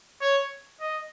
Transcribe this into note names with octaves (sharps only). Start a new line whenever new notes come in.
C#5
D#5